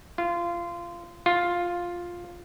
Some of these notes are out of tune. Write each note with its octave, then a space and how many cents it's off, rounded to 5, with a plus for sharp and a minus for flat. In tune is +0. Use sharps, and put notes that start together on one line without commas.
F4 -20
F4 +5